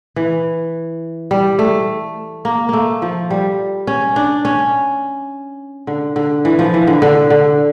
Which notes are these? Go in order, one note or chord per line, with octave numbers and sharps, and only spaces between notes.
E3
G3
A3
A#3
A3 A#3
F3
G3
C#4
D4
C#4
D3
D3
E3
F3
E3
D3
D3
D3